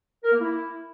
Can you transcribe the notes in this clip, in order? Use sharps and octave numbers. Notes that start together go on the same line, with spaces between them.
A#4
A#3
E4